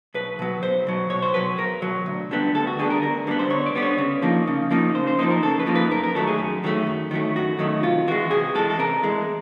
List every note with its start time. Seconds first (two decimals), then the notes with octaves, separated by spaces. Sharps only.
0.14 B1 B4
0.39 B2 F#3
0.62 B1 C5
0.87 B2 F#3
1.10 B1 C#5
1.22 C5
1.34 B2 F#3 B4
1.58 B1 A#4
1.82 B2 F#3
2.06 D2
2.31 D3 G3 B3
2.54 D2 A4
2.67 F#4
2.79 D3 G3 B3 G#4
2.90 A#4
3.02 D2 A#4
3.27 D3 G3 B3
3.39 C5
3.50 D2 C#5
3.66 D5
3.75 D3 G3 B3
3.82 C#5
3.98 C#3
4.22 F3 A#3 D#4
4.47 C#3
4.70 F3 A#3 D#4
4.94 C#3 C5
5.07 C5
5.19 F3 A#3 D#4 C5
5.30 A#4
5.43 C#3 A4
5.60 B4
5.67 F3 A#3 D#4
5.75 B4
5.91 F#2 A#4
6.03 A#4
6.15 D#3 F#3 A3 A4
6.27 G#4
6.39 F#2
6.64 D#3 F#3 A3
6.87 F#2
7.11 D#3 F#3 A3
7.36 F#2 F#4
7.59 D#3 F#3 A3
7.83 C3 F4
8.08 E3 G#3 F#4
8.31 C3 G#4
8.55 E3 G#3 A4
8.70 A4
8.79 C3 A#4
9.03 E3 G#3